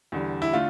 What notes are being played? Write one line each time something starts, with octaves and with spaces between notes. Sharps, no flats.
E2 D3 G3
E4
D3 A3 F4